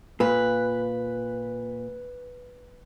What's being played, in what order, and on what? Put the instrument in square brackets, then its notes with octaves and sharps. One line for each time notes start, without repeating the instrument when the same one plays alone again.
[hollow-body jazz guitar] A#2 [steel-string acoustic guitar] B4